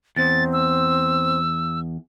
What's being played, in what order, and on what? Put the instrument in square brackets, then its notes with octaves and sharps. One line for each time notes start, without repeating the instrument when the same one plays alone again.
[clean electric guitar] E2 [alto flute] C4 [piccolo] A6
[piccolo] E6